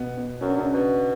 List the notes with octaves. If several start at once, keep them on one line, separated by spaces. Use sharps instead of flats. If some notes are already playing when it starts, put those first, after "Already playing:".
Already playing: B2 B3
B2 B3
F#2 C#4
D4
F#2 C#3 C#4
B2